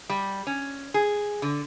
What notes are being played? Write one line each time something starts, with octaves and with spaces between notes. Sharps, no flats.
G3
C#4
G#4
D3